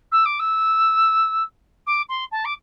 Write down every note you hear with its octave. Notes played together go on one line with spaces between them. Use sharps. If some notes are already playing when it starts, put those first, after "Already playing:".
E6
D6
E6
D6
C6
A5
D6